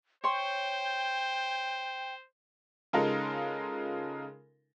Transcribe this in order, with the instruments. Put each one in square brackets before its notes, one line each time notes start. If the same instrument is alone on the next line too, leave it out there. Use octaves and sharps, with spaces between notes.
[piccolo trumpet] C5 [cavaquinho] C#5 C6 [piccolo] G5
[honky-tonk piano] C#3 G#3 D#4 F4 A4 A#4